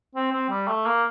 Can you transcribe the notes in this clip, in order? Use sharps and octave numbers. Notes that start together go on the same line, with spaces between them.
C4
C4
G3
A3
A#3